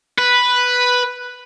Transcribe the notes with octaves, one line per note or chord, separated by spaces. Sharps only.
B4